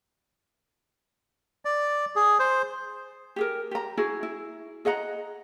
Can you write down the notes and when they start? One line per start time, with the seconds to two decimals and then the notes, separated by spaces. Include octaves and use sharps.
1.65 D5
2.16 G#4
2.39 C5
3.36 G4 G#4 A#4
3.71 G4 A#5
3.98 E4 F#4 G#4
4.23 E4
4.85 G#4 D#5 F#5 A#5